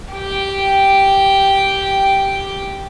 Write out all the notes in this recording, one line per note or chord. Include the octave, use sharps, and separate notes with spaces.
G4 G5